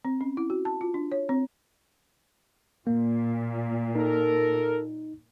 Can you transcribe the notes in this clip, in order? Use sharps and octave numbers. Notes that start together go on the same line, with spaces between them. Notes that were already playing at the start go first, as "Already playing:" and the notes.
C4
C#4
E4
F#4
A5
F4
D4
C#5
C4
A#2 A#3
D#4 A4 A#4